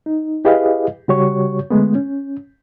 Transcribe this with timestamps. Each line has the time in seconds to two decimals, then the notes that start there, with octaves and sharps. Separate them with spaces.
0.06 D#4
0.45 E4 G4 G#4 B4 D#5 F5
1.08 C#3 G3 F#4 G4 C#5 C#6
1.70 D3 G#3 A3 B3
1.95 C#4